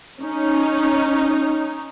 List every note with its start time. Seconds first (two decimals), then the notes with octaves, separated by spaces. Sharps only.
0.20 C#4 D#4